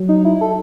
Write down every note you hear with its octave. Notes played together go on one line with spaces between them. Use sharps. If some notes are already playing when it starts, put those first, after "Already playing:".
Already playing: F#3
D#4
E4
A4